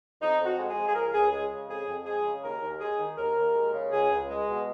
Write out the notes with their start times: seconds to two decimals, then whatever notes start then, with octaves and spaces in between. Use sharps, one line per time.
0.21 F2 D#4
0.39 F2
0.46 F#4
0.58 G#3
0.70 G#4
0.76 F3
0.88 G#4
0.95 C#2 A#4
1.14 C#2 G#4
1.32 G#3 G#4
1.51 C#3
1.69 F2 G#4
1.87 F2
2.06 G#3 G#4
2.25 C#3
2.44 D#2 A#4
2.62 D#2
2.80 G#3 G#4
2.99 D#3
3.18 D#2 A#4
3.36 D#2
3.54 G#3
3.73 C#3
3.92 C#2 G#4
4.10 C#2
4.29 G#3
4.48 B2